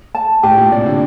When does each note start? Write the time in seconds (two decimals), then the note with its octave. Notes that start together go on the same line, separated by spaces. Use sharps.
0.15 A5
0.43 A2 G4
0.57 A#2
0.72 C3 D5
0.86 D3